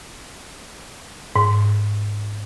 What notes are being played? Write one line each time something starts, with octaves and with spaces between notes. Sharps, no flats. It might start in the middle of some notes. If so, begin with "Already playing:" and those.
G#2